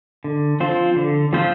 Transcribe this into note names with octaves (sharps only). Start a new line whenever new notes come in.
D3
F3 C4 F4 C5
D3
F3 C4 F4 C5